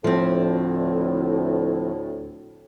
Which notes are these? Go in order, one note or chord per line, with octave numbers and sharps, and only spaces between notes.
D2 A2 F3 C4